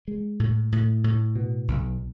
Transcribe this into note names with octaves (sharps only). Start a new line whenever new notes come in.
G#3
A2
A2
A2
B2
B1